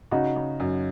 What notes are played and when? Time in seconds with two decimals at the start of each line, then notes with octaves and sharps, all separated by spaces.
0.11 C#3 D#4 F#4
0.36 C#3
0.60 F#2